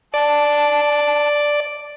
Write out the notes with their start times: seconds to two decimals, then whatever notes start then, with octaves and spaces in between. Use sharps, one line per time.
0.14 D5 A5